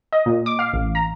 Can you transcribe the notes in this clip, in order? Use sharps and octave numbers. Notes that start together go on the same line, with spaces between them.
D#5
A#2
D6
F5
A1
A#5